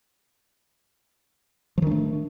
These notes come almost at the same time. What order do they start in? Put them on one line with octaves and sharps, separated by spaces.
F3 D#3 D4 A3